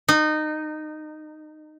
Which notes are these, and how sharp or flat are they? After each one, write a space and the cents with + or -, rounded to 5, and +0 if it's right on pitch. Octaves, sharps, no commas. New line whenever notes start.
D#4 -20